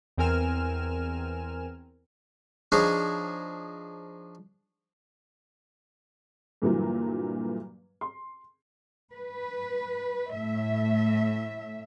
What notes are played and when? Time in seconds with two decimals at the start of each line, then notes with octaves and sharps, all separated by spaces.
0.18 E2 C4 A#4 G#5 F6 E7
2.72 F3 D4 D#4 G#4 C#5
6.62 G2 A#2 D3 E3 F#3
8.01 C6
9.14 B4
10.33 A2 E5